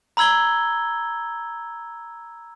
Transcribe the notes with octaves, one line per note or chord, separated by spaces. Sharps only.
A#5 B5 E6 G#6 G7